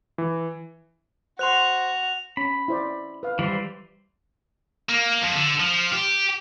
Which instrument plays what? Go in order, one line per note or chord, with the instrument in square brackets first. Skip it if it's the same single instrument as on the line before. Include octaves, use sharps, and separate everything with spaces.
[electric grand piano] E3
[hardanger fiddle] F#4 [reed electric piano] C5 C6 [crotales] F#6 F7
[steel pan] C#4 [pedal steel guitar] B5
[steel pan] E4 C5 D5
B4 F5
[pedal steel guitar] E3 G3 C5
[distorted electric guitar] A#3
F2
D3
F3
G4